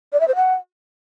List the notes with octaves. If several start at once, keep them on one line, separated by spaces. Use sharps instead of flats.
D5
E5
C5
F#5